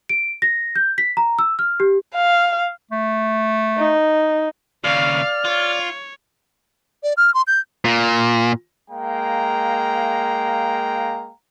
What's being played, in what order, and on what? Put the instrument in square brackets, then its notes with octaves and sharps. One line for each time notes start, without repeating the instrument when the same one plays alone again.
[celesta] D7
A#6
G6
B6
A#5
E6
F6
G4
[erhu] F5
[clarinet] A3
[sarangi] D#4
[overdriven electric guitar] D#2 C#3 [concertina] D5 [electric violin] F5 [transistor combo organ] F6
[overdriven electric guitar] F4 [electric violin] C#5
[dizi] D5
F6
C6
G6
[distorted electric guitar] A#2
[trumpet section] G#3 A#3 F5 G5 A#5